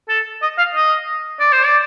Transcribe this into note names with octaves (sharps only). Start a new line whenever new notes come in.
A4
D#5
F5
D#5
D5
C5
D5